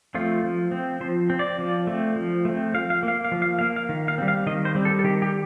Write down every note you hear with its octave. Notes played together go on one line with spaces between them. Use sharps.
F3 A3 C4 F4
F3
C4
F3 C5
C4
D5
F3
A3 C4
F3
A3 C4
F3 F5
F5
A#3
F5
F5
F3
F5
A#3 F5
F5
D#3
F5
G3 C4
F5
D#3 D#5
C5
G3 C4
A4
A4
D#3 G4
G4